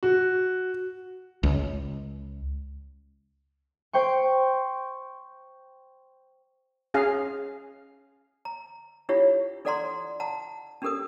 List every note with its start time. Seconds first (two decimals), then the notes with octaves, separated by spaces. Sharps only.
0.03 F#4
1.43 C#2
3.93 C5 G5 C6 C#6
6.94 C#4 G#4 F5
8.45 A#5
9.09 D4 E4 F4 G4 C#5 F#5
9.65 D4 A4 D5 F#5 A#5 C6
10.20 F#5 A5 A#5
10.82 C#4 D4 G4 A4 A#4 D#6